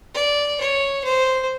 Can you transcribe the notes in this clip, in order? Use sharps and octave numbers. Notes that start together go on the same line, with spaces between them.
D5
C#5
C5